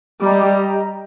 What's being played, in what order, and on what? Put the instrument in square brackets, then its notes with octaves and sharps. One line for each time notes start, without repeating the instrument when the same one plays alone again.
[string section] G3 [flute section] G4 D#5 A#5